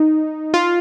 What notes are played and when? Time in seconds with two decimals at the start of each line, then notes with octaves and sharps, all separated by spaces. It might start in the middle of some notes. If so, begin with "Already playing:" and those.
Already playing: D#4
0.54 F4